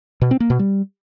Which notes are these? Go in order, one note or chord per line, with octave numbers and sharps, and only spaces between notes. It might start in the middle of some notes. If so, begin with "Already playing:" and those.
B2
C4
A#3
B2
G3